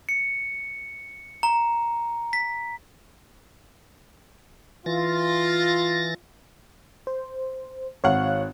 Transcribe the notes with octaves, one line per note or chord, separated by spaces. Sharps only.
C#7
A#5
B6
E3 F4 A6 A#6
C5
G#1 C#5 F5 F#5 F#6